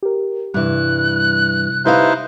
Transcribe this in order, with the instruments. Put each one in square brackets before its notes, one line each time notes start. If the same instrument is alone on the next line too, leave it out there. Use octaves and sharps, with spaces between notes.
[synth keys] G4 A#4
[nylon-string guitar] G2 E3 [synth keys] C3 G3 [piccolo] F#6
[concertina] D#4 E4 C5 [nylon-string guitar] G4 B4 F5